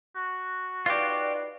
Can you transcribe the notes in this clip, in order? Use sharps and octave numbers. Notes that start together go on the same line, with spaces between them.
F#4
D#4 F4 G4 B4 D5